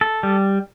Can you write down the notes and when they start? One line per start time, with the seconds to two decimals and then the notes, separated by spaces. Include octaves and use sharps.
0.01 A4
0.23 G3